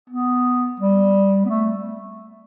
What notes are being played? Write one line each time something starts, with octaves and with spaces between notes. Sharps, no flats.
B3
G3
B3
A3